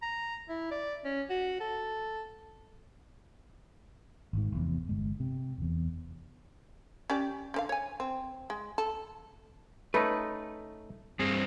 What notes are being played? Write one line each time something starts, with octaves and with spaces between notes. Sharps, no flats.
A#5
E4
D5
C#4
F#4
A4
G#1 G#2
F1 E2
G1 G#3
C3
F1 E2
C#4 G4 D5
D3 C#4 F5
C#5 G#5
C4
G#3
A4
A3 C#4 D#4 B4
G2 C4 G#4